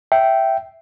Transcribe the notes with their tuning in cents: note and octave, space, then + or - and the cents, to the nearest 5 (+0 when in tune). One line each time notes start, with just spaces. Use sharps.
E5 +0 G5 -10